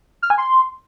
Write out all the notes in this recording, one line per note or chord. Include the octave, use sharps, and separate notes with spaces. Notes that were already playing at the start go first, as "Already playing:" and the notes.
F6
G#5
C6